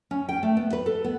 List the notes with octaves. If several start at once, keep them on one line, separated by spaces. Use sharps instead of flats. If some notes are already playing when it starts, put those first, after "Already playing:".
C#4
G5
A3
B3
B4
A4
B3